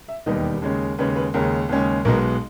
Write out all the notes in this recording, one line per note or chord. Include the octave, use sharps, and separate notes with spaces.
E5
E1 D#2 D#3 G3 B3 D#5
D#2 C#3 G#3 C#4
D#2 C#3 G#3 C#4 B4
B4
D#2 C#3 G#3 C#4 A#4
D#2 C#3 G#3 C#4
B1 B2 G#3 B3 A#4